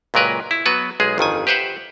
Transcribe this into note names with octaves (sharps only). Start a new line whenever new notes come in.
C#2 A#2 F#3 A#4 B4
E4
F#3 B3 F#4 B4
B1 G#3 G#4
G1 F2 D#3 G#5
G4 B4 C5 E5 F#5